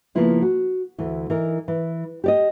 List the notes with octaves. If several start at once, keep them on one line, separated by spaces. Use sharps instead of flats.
C#3 F3 A#3 B3 E4 F4
F#4
D2 E3
E3 D#4 A#4
E3
G4 D5 D#5